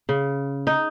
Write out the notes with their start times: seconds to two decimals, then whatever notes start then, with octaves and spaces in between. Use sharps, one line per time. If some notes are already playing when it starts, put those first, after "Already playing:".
0.09 C#3
0.67 D#4